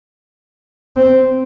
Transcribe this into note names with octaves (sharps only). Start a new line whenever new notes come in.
C4